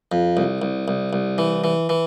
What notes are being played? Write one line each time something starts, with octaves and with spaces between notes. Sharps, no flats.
F2
C2
C2
C2
C2
E3
E3
E3